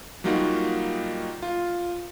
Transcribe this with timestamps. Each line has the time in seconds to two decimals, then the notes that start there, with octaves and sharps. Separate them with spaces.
0.24 F#3 G3 A#3 D#4 F4 F#4
1.42 F4